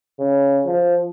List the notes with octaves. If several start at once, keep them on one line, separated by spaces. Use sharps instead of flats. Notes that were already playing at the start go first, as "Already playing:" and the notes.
C#3
F3